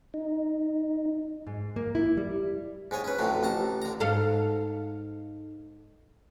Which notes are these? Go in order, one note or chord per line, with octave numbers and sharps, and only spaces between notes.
D#4
G#2
A#3
E4
G3
G#2 G#3 C#5 G#5
C#4 B4
F2 A2 D3 F#3
A1 A5 A#5
D3 A#5
G#2 A4 F5